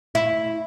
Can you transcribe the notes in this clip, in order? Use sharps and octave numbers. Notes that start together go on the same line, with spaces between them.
E4